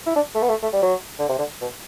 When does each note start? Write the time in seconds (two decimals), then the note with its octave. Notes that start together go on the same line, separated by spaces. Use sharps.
0.06 E4
0.16 D4
0.35 A3
0.42 B3
0.49 A3
0.62 A3
0.73 G3
0.82 F#3
1.19 D3
1.29 C3
1.38 D3
1.62 B2